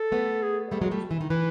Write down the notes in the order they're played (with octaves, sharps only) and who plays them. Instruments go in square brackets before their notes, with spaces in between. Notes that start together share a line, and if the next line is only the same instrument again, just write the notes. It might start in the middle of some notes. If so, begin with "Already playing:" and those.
Already playing: [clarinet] A4
[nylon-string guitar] A3 B3
[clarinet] G#4
[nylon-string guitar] G3 A3
F#3 G#3
G3 A3
E3
D#3
[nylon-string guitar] E3 [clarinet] B4